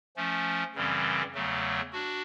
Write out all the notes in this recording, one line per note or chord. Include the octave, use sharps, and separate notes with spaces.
F3 A3 C#4
F#2 C#3 E3 G3 C4
E2 C#3 F#3 A3
D4 F#4